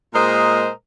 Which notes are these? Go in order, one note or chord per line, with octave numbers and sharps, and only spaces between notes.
A#2 G#3 A#4 C5 D#5